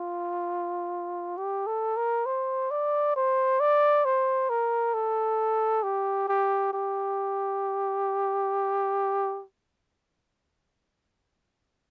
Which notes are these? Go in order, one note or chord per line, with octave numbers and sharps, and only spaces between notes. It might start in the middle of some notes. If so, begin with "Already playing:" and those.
Already playing: F4
G4
A4
A#4
C5
D5
C5
D5
C5
A#4
A4
G4
G4
G4